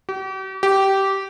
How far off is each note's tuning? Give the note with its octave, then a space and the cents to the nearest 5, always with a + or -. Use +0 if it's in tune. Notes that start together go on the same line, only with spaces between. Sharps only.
G4 -40
G4 -15